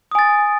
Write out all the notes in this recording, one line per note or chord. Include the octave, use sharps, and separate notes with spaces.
G#5 D#6 A6